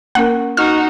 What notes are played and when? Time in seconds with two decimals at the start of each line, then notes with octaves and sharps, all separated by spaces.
0.15 A#3 C#4 A#4 F#5
0.57 D#4 F#4 F6